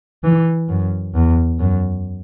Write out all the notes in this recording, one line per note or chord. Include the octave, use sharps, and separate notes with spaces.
E3
F#2
E2
F#2